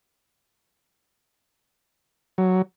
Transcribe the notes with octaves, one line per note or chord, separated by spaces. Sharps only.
F#3